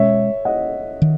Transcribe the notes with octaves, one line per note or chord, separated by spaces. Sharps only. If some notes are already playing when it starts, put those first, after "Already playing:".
Already playing: B2 G#3 C#4 C#5 E5
D#5 F#5
D#3